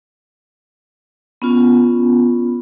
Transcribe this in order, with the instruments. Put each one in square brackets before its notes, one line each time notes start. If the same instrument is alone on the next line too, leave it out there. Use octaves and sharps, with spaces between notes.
[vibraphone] B3 C#4 F4